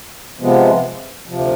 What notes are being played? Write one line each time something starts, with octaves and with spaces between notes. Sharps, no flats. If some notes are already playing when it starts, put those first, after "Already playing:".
C3 F3 G#3 B3
D2 C3 F3